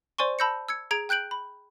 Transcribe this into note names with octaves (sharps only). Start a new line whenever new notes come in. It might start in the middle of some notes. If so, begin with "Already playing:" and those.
C5 D5 G#5 C6 C#6
A5 B5 E6 G6 A#6 C#7
E6 G#6 C#7
G#4 A#5 G#6 D7
G5 F#6 G6 D7 F#7
B5